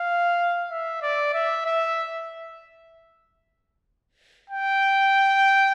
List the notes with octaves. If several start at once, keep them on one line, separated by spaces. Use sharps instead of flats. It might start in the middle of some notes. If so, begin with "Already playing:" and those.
Already playing: F5
E5
D5
E5
E5
G5